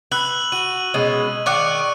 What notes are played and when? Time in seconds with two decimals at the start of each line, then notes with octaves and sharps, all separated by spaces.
0.12 B4 E6 F#6 F#7
0.52 F#4 D#7
0.94 B2 G#3 C#4
1.46 D#3 D5 F5 C#6 F#6 C#7